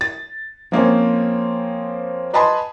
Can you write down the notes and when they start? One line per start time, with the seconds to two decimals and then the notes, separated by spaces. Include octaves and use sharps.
0.01 A6
0.72 F3 A#3 C4 C#4
2.33 B4 D#5 G#5 A5 B5 C6